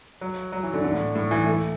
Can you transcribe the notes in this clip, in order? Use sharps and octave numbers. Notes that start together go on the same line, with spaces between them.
F#3
F#3
E3
D3
D3
A2
A2
E3
A3